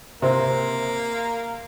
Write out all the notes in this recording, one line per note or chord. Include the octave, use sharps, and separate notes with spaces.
C3 A#3 C4